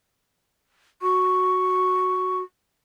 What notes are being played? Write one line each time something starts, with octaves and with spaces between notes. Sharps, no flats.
F#4 C#6